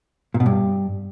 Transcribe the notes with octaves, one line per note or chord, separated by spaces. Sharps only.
A#2
B2
G2